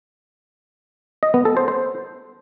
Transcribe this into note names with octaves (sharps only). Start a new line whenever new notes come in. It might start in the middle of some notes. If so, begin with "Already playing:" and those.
D#5
B3
A4
C5
C5